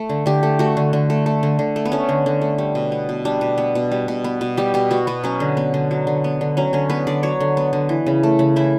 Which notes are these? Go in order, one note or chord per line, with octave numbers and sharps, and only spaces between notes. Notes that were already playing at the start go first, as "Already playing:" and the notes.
Already playing: A3
D3
D3 G4
A3
A3 F#4
D3
D3
A3
A3
D3
D3
A3
B3
A3 C#4
D3
D3
A3
G3
B2
B3
B2
G3 D4
B2
B3
B2
G3
B2
B3
B2
G3 G4
B2 G4
B3 F#4
B2 B3
F#3 C#4
D3
B3
D3
F#3
D3
B3
D3
F#3 C#4
D3 C#4
B3 B4
D3 D5
F#3 C#5
D3
B3
D3
E3
C#3
A3
C#3
E3 E4